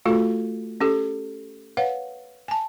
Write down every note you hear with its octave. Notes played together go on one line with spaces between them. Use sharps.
A3 F4 F#4 A4
C#4 G4 A4
B4 C#5 F5 F#5
G#5 A5